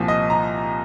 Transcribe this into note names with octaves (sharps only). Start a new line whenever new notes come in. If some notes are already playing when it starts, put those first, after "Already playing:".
Already playing: C2 A#2 F3
D#5
A#5